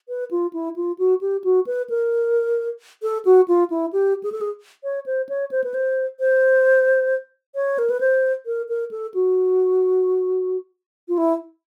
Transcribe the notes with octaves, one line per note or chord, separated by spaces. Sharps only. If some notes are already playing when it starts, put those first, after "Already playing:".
B4
F4
E4
F4
F#4
G4
F#4
B4
A#4
A4
F#4
F4
E4
G4
G#4
A4
G#4
C#5
C5
C#5
C5
B4
C5
C5
C#5
A#4
B4
C5
A#4
A#4
A4
F#4
F4
E4